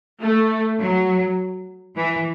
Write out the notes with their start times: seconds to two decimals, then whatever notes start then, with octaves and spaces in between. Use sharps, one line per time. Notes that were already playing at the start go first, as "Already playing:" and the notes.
0.23 A3
0.80 F#3
1.96 E3